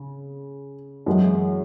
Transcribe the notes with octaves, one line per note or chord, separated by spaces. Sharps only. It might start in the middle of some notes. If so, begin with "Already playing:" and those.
Already playing: C#3
F#2 E3 G#3